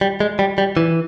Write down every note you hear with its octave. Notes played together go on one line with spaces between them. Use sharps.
G3
G#3
G3
G3
E3